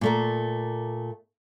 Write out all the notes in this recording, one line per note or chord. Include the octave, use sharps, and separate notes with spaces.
A#2 A3 A#3